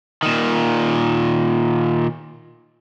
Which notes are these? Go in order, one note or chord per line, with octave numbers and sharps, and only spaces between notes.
A#2 D#3